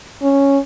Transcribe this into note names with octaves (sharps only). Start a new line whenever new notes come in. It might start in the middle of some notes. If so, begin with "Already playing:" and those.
C#4